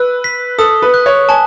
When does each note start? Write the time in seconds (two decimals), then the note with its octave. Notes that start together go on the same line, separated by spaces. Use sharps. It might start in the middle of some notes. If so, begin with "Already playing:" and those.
Already playing: B4 E6 F#6
0.24 B6
0.58 A4 D#6
0.82 B4
0.94 F#6
1.06 C#5
1.29 G#5 A5